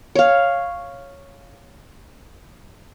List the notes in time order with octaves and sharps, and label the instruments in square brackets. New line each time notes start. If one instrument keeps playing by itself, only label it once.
[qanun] C#5 F5